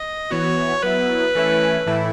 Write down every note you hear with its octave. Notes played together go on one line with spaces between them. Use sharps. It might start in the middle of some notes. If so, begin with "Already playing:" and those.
Already playing: D#5
E3 B3 F#4 C#5
F#3 B3 E4 B4
E3 A3 C#4 E4
A2 E3 A3 E4